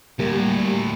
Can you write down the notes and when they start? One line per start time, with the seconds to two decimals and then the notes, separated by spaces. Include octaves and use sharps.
0.19 D2 A2 G3 A#3 G4 A#4